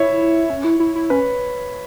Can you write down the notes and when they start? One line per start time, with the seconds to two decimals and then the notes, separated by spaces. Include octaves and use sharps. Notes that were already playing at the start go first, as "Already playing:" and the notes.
Already playing: E4 C#5 E5
0.50 C#4
0.64 E4
0.80 E4
0.95 E4
1.10 C#4 B4